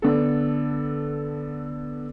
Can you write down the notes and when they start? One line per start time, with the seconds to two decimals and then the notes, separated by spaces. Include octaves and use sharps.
0.02 D3 B3 A4